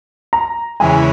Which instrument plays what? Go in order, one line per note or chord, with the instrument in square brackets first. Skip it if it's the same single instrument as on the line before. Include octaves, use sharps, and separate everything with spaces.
[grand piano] A#5
[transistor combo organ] E2 C#3 E3 G#3 [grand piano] G#5